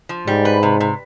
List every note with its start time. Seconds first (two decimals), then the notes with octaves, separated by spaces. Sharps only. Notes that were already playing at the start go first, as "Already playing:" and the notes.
0.09 F3
0.27 G#2 G3
0.45 B4
0.63 C3
0.80 C3